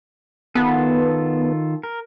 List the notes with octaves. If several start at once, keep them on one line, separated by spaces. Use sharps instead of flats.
D#3 B3 F4 A4
A#4